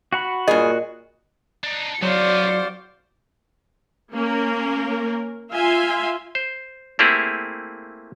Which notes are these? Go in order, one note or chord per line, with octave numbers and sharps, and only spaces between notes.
F#4 F#5 B5
G2 A#2 G#4 D#5
D4 D#4
C#3 F#3 B3 F#4 C5 D5 F5
A#3 C#4 A#4
F4 E5 F5 G#5 C6
C5
A3 A#3 C4 E4 G4 G#4